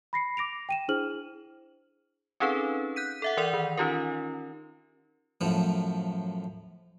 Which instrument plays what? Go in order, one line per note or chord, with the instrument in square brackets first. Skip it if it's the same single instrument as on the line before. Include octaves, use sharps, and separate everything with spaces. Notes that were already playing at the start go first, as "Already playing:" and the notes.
[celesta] B5 A#6 C7 C#7
D6 A#6 D7 F7
G5 D#7 E7
D4 E4 G#4 C5 F6 F#7
[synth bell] C4 C#4 D#4 G#4 A4 B4
F#6 G6 B6 D#7
A4 E5 F#5
E3 A#4 D5 F#5 G6 F7
D#3
C#4 D#4 F4 G4 A#4
[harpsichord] F#2 A2 F3